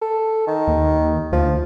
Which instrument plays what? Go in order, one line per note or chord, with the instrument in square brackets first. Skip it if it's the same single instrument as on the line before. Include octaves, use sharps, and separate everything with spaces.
[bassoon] A4
D#3
[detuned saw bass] D#2
[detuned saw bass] D2 [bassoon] F3